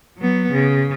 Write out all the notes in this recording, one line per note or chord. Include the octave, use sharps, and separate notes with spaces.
F#3 B3
C#3